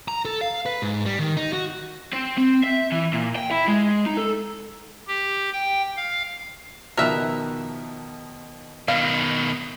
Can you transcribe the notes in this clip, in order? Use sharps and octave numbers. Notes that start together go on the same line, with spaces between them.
A#5
A4
F5
B4
G#2
G3
D#3
D#4
F#4
C4
C4
E5
E3
A#2
G5
E4
G#3
D#4
A4
G4
G5
F5
B2 D#3 F3 A#4 B4 E5
B2 D#3 F5